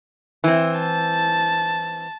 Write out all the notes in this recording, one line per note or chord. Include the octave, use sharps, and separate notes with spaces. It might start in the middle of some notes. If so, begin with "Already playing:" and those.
E3 C4
A5